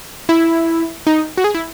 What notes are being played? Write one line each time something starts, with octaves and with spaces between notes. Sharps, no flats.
E4
D#4
F#4
G#4
E4